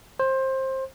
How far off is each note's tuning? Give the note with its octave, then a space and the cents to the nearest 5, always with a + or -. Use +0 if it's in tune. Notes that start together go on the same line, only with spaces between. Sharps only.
C5 +20